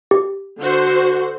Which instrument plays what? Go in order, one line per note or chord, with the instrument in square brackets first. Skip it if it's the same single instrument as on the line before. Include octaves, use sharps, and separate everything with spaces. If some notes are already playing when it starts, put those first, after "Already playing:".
[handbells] G4
[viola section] D3 F#4 C5